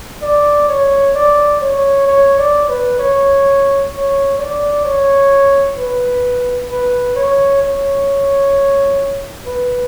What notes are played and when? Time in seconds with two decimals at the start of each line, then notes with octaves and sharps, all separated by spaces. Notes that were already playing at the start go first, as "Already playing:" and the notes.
0.22 D5
0.68 C#5
1.15 D5
1.61 C#5
2.06 C#5
2.38 D5
2.69 B4
2.99 C#5
3.92 C#5
4.38 D5
4.84 C#5
5.77 B4
6.70 B4
7.16 C#5
7.62 C#5
9.47 B4